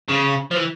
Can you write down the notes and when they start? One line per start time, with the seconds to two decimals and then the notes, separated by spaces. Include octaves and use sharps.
0.08 C#3
0.51 F3
0.56 E3